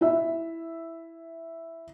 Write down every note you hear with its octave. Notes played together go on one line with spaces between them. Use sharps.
E4 E5